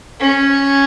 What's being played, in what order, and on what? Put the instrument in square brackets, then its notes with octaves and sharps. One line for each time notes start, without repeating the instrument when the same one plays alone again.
[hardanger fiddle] C#4